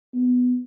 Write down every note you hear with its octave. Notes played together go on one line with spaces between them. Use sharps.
B3